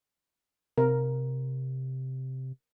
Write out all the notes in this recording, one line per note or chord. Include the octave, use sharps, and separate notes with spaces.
C3 A#4